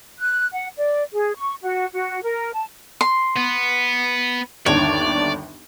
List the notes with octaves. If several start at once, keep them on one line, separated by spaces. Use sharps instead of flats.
F#6
F#5
D5
G#4
C#6
F#4
F#4
A#4
A5
C6
B3
G1 D#2 D4 C#5 D5